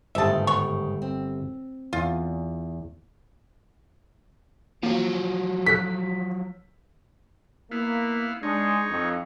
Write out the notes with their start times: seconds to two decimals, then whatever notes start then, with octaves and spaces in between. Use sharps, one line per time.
0.15 G1 G#2 D#3 A3 D#5 E5 A5
0.47 B3 C#5 C#6
1.02 C4
1.93 E2 F4
4.83 F3 F#3 A#3
5.67 F#4 A4 F#6 B6
7.72 A#3 B3 E4 F5
8.43 G#3 D4 D#4 C#5
8.90 F2